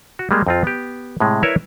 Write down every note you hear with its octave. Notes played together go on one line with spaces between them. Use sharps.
F#4
G3 G#3 A#3
F2 C4 F4
B3 G4
A2 C3 G#3
E4 A#4 B4 C#5 D5 E5